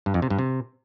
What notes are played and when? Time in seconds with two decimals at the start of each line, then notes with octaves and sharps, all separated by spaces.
0.06 G2
0.14 F2
0.22 C3
0.30 G2
0.39 C3